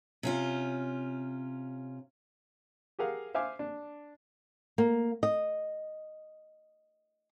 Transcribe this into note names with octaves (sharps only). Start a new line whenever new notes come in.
C3 C#4 F4
G4 G#4 A#4 F5 F#5
C5 E5 F5 G#5 D6
D4
A#3
D#5